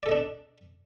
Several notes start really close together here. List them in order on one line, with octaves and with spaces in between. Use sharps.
D5 A4 D#5 D4